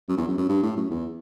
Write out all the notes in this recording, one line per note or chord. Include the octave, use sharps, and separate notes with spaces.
F#2
E2
F#2
F#2
G2
A2
F#2
E2